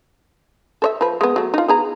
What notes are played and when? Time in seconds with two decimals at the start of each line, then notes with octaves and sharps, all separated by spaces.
0.82 A4 C#5 E5
1.01 F3 B4
1.21 G#3 B3
1.36 F#3 A3
1.54 D#4 F4
1.68 B3 G#4 A#5